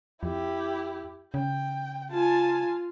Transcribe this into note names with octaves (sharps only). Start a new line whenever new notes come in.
F2 E4 G4
C#3 G5
F4 G#5 A5